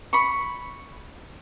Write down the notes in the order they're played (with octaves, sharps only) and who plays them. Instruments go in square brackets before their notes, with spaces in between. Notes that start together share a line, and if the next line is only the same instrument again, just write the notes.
[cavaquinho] B5 C#6